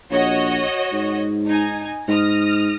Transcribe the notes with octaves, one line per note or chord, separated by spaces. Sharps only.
A#1 F#4 C#5 D#5
G#2
D#4 G#5
G#2 D#6 F6 A#6